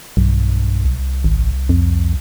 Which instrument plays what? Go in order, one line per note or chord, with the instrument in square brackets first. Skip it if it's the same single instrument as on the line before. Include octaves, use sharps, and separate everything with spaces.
[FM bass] B1 [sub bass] G2
[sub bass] C2
[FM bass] G#1
F2